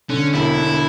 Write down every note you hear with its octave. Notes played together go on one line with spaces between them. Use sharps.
D3 C#4
E1 E4
D3